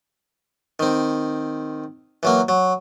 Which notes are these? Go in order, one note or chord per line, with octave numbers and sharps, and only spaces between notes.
D#3 C4
E3 F#3 A#3
F#3